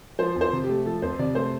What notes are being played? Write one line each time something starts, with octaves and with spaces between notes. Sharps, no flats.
F3 C5
F2
C5
C3
G4
A3
F3 A4
F2 C5
C3 D5
A3 C5